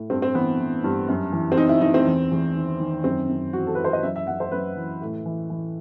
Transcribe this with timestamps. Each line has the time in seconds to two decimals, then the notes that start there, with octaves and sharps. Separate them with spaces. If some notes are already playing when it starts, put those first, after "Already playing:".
Already playing: A2
0.10 G2 C4
0.22 C4
0.34 E3 B3
0.60 E3
0.84 G2
1.08 F#2
1.33 E3
1.52 C4
1.57 E3 D#4
1.69 E4
1.81 E3 D#4
1.94 C4
2.07 E2
2.32 E2
2.56 D#3
2.80 D#3
3.04 F#2 C4
3.29 F#2
3.53 E3 F#4
3.66 A4
3.75 E3 B4
3.84 C5
3.93 D#5
4.03 F#2 E5
4.16 E5
4.27 F#2 F#5
4.40 C5
4.52 F#2 B4
4.77 E3
5.02 A2
5.26 E3
5.50 E3